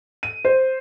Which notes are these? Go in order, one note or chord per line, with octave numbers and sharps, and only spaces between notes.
D#7
C5